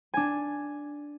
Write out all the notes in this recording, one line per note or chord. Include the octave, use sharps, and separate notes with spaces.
D4 G#5